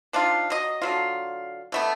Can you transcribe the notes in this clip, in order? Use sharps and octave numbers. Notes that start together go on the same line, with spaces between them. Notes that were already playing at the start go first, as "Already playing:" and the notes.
F3 D4 D#4 F4
F#3 D#5
D3 F#3 F4
D3 A3 B3